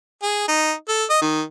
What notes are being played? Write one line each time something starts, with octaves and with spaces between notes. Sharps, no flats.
G#4
D#4
A4
D#5
D#3